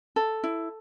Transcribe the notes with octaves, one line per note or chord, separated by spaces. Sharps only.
A4
E4